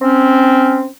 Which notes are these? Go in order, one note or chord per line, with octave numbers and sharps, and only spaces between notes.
C4 C#4